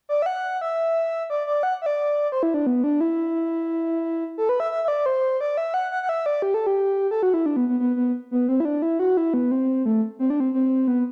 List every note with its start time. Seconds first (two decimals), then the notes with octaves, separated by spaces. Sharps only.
0.09 D5
0.22 E5
0.26 F#5
0.61 E5
1.30 D5
1.47 D5
1.63 F#5
1.82 E5
1.86 D5
2.32 C5
2.43 E4
2.54 D4
2.67 B3
2.84 D4
3.01 E4
4.38 A4
4.49 B4
4.60 E5
4.72 E5
4.84 E5
4.88 D5
5.06 C5
5.41 D5
5.57 E5
5.74 F#5
5.91 F#5
6.03 F#5
6.09 E5
6.26 D5
6.42 G4
6.54 A4
6.67 G4
7.11 A4
7.23 F#4
7.34 E4
7.46 D4
7.56 B3
7.68 B3
7.80 B3
7.96 B3
8.31 B3
8.49 C4
8.60 E4
8.65 D4
8.82 E4
8.99 F#4
9.17 E4
9.34 B3
9.51 C4
9.86 A3
10.19 C4
10.30 D4
10.40 C4
10.54 C4
10.88 B3